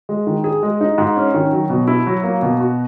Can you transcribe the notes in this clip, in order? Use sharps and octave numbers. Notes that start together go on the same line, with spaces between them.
G#3
D#3
G#4
G#3
D#4
G#2
C#4
D#3
F#3
B2
E4
F#3
A#3
B2
F#4